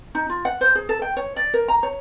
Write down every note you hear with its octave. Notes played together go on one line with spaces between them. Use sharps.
D#4
F4
F#5
C5
G#4
A4
G5
C#5
D5
A#4
A#5
C#5